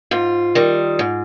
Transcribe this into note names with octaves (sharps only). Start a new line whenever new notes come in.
G#2 F4
D#3 G3
G#2